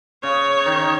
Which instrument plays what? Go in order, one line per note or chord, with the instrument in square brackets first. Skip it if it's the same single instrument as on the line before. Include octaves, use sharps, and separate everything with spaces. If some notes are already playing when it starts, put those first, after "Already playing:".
[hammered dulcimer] C#3 [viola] C#5
[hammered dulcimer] D#3 D#4